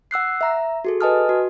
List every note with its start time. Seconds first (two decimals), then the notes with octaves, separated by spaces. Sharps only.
0.11 F#5 E6 F#6 C7
0.41 E5 A#5
0.85 F#4 G#4 A4
1.01 B4 D#5 G#5 A5 D#6 F6
1.29 F#4